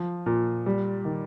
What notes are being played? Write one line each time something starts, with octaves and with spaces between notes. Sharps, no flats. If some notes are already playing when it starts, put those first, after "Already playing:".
Already playing: F3
A#2
G3
D#3